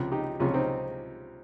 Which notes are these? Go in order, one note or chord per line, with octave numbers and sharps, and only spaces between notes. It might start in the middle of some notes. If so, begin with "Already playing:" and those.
Already playing: C#2 C3 F3
D#4 G4
C#2 C3 F3 C#4 F4
C4 D#4